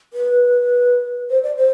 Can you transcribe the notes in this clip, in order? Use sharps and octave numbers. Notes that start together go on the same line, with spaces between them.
B4
C5
D5
C5